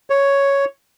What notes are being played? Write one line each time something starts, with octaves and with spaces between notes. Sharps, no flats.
C#5